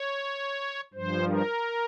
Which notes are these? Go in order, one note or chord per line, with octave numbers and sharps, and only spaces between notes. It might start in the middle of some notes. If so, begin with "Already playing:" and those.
Already playing: C#5
G2 F3 C5
A#4